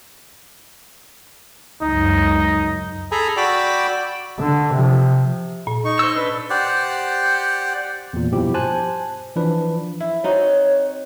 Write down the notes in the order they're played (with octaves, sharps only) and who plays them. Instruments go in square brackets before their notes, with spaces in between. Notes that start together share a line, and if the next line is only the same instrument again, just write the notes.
[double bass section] C#2 F#2 [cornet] D#4
[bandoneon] G#4 A4 G#5 A#5 B5
F#4 D5 G5 B5 D6 E6
[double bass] D3
C3 F3
[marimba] A#2
[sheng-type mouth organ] D#4 C#6
[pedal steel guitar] C5 E6
[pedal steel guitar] D4 [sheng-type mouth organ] B4
[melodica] G4 C5 D5 F#5
[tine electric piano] E2 A#2
G2 B2 F3 E4 G4
C5 G#5 A5 F#6
E3 F3 D4 B4
[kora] E4
[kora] C4 D#4 F#4 [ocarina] C#5